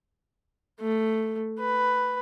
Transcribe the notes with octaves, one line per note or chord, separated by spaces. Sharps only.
A3
B4